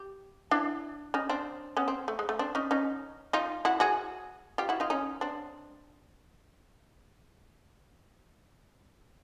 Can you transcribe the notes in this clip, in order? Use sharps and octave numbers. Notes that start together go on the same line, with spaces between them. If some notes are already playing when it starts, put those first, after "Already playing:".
Already playing: G4
D4 E4
C#4 D#4
C4 D4
B3 C#4
C4
A3
G#3
A3
C4 D4
C#4 D#4
C#4 D#4
D#4 F4
E4 F#4
F#4 G#4
F4 G4
E4 F#4
D#4 F4
C#4 D#4
C4 D4